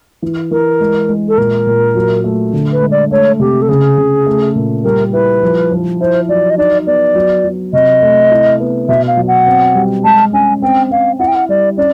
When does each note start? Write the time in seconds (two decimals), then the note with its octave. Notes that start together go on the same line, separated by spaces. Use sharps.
0.22 E3
0.51 E3 A#4
0.80 G#3
1.09 G#3
1.28 A4
1.38 A#2 A#4
1.67 A#2
1.95 F#3
2.24 A3
2.53 D3
2.72 B4
2.82 G#3
2.91 D5
3.11 A3 C#5
3.40 C3 G4
3.62 A4
3.69 C#3 G#4
3.98 C#3
4.26 A3
4.55 A#2
4.84 G3 A#4
5.13 E4 B4
5.42 F3
5.71 F3
6.00 E4 C5
6.29 F#3 D5
6.50 D#5
6.58 D#4 D5
6.87 B3 D5
7.15 F#3
7.44 F#3
7.73 C3 D#5
8.02 A3
8.31 E4
8.60 B3
8.88 B2 E5
9.07 F5
9.17 F#3
9.28 F#5
9.47 C4
9.75 G3
10.04 G#3 A5
10.33 C#4 G#5
10.62 C4 G5
10.91 C4 F5
11.19 E4 F#5
11.28 G5
11.35 F#5
11.49 G3 D5
11.77 C#4 D5